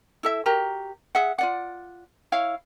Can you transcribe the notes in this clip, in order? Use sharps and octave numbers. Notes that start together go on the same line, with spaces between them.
E4 A4 E5
F#4 G4 A#4 A#5
G#4 E5 F#5
F4 D5 F#5
E4 C#5 F5